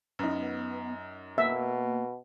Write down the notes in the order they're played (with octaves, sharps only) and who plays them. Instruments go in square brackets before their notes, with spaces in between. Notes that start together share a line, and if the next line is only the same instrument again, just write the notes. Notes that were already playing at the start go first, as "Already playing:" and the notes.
[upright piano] F#2 D#4 [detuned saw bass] B3
[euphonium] B2 [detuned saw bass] A#3 [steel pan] E5